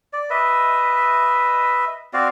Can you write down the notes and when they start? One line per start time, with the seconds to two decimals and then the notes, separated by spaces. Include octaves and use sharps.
0.13 D5
0.30 B4 D#5 E5
2.13 C4 F#4 D5 F5